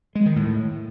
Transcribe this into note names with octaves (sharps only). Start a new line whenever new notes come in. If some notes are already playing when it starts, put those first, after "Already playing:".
G#3
D#3
A2